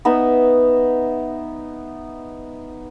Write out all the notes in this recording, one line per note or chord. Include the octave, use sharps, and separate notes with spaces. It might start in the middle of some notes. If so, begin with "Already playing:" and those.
B3 D#4 E5